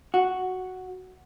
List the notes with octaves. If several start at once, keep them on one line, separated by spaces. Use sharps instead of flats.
F#4